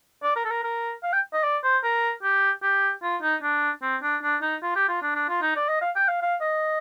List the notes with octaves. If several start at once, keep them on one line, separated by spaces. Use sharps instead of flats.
D5
A#4
A4
A#4
A#4
F5
G5
D#5
D5
C5
A#4
G4
G4
F4
D#4
D4
C4
D4
D4
D#4
F4
G4
F4
D4
D4
F4
D#4
D5
D#5
F5
G5
F5
F5
D#5